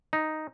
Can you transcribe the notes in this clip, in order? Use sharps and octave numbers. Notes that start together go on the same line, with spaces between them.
D#4